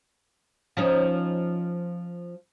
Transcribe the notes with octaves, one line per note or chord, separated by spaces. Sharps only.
F3 C#4 D#4